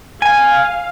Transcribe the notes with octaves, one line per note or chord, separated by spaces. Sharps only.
F5 G#5